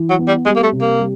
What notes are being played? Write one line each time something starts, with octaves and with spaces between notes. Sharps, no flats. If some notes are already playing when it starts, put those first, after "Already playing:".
Already playing: E3
F#3
B3
G3
G3 G#3
A#3
A3
C3
A#3
G3